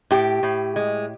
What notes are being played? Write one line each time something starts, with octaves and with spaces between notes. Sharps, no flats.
A2 G4
A2
G#3